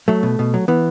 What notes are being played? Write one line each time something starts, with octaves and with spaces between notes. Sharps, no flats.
F#3 A3
B2
B2
F#3
E3 B3